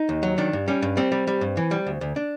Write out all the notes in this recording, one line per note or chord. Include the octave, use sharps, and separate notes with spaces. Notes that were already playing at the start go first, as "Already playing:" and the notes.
Already playing: D#4
D#2
F#3
D#3 D4
G2
G3 C#4
G2
G3 C4
G3
G3
G2
E3
G3
D2
D2
D4